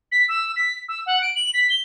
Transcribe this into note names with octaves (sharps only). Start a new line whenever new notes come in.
B6
E6
B6
E6
F#5
D7
F#7
B6
G7